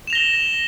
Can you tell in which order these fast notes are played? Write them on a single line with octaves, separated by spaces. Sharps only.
E7 F7 A#6 G7